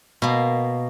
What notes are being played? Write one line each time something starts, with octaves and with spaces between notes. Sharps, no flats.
B2 A#3